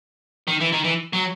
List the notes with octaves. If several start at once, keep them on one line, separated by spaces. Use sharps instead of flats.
D#3
E3
D#3
E3
F#3